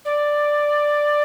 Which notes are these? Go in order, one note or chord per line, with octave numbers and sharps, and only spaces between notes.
D5